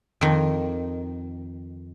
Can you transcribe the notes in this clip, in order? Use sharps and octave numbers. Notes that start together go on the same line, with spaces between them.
F2 D#3